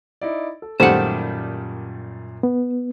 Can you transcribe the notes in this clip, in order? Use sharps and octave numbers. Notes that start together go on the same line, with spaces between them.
D#4 E4 D5
A4
F#2 A#2 D#3 G3 A3 C5 F#5 A5
B3